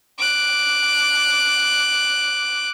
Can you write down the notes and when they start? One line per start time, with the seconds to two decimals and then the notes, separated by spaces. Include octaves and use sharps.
0.19 D6 F#6